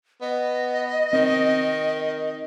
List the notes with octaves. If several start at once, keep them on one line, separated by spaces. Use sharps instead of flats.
B3 D#5
D#3 C4